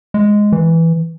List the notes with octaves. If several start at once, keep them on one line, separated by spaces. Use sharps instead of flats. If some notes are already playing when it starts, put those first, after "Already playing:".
G#3
E3